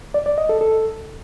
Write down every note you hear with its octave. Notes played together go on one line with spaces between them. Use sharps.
D5
D5
D#5
A4
A4